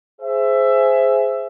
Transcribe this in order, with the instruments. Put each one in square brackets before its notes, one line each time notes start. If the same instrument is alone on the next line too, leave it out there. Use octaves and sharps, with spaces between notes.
[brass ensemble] G#4 C5 E5